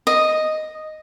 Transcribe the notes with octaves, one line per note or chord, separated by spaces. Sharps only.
D#5